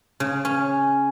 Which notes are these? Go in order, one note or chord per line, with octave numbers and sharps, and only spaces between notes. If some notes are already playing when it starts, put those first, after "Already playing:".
C#3
C#4